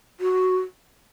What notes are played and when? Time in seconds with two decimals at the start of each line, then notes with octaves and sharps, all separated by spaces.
0.20 F#4